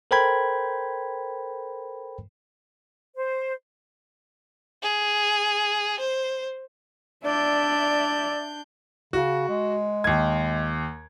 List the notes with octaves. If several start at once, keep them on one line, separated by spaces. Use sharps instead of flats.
A4 A#4 C5 G5 B5 G#6
C5
G#4
C5
D4 D5 E5 G6
C#3 F#4
G#3
D#2 G#6